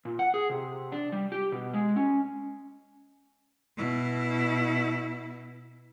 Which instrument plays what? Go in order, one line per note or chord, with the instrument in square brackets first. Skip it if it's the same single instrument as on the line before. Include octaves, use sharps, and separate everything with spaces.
[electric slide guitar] A#2
F#5
G#4
C3
D4
G3
G4
B2
G#3
C#4
[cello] B2 E4